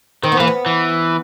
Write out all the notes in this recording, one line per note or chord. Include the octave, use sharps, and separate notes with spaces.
D#3 C4
B3
E3 A#3
B3
E3